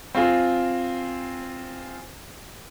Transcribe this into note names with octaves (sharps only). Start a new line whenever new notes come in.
C4 F4 G#4